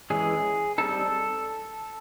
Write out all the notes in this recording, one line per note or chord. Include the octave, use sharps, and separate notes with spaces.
E3 G#3 C#4 G#4
G3 C4 D#4 A4